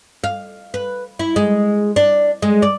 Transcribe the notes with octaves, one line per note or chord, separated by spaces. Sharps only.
F5
B4
E4
G#3
D4
G#3
D5